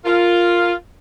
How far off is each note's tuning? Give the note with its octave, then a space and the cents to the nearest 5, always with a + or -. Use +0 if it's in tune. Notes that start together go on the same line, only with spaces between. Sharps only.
F4 +0 A#4 -10